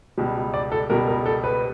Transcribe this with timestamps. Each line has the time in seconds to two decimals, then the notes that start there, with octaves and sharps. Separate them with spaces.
0.17 C#2 B2 G3
0.54 D5
0.72 A4
0.90 C#2 B2 G3 A#4
1.08 A#4
1.26 A4
1.44 B4